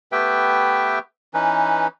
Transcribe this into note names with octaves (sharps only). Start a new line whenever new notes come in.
A3 B3 G4 B4 E5 G5
E3 C#4 D#4 B4